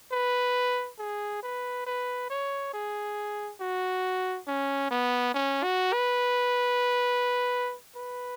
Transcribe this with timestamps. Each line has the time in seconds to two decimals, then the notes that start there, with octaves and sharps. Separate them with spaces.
0.12 B4
0.99 G#4
1.43 B4
1.87 B4
2.30 C#5
2.73 G#4
3.61 F#4
4.48 C#4
4.90 B3
5.34 C#4
5.63 F#4
5.93 B4
7.96 B4